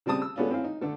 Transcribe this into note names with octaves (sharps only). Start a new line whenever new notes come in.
C#3 G3 C4 A5 D#6
E6
G#3 A3 B3 C#4 D4 F4
C4 C#4 E4 F5
D#4
D3 A3 A4